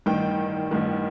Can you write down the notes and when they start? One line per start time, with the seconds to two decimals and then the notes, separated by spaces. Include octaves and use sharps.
0.06 A1 G2 D#3 G5
0.71 A1 G2 D#3